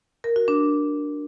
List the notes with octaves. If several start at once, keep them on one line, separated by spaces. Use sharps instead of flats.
A#4
F#4
D4